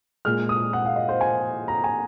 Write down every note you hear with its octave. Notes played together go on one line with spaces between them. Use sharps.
A#2 G#3 F6
D#6
F#5
F5
D#5
C5
G#5
A#5
G#5